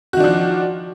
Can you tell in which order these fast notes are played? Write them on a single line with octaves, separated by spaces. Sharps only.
F#4 D#3 D4 F3